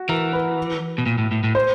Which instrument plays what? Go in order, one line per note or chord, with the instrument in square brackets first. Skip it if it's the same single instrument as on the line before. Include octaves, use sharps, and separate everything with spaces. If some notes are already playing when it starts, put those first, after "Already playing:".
Already playing: [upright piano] F#4
[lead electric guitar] E3 [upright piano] A#4
[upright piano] B4
[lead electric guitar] B2
A#2
A2
A2
A2
[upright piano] C5